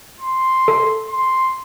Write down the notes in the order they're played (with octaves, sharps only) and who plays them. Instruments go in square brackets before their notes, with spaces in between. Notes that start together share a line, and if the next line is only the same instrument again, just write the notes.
[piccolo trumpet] C6
[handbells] A4
[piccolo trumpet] C6